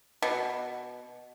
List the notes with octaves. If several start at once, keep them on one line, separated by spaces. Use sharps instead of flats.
B2